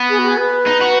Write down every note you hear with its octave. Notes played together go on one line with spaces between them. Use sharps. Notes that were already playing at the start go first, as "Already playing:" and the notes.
Already playing: B3
G#4
F#4
G#4
B4
D#4
F#4